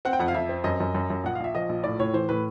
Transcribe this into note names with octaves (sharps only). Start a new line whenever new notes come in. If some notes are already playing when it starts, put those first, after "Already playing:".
C4 F#5
G5
F2 F#5
F5
F2 E5
C4
F#2 D#5
F#2
F#2
F#2
A#1 F#5
F5
A#1 E5
F3 D#5
A#1
A2 D5
A2 C#5
E3 C5
A2 B4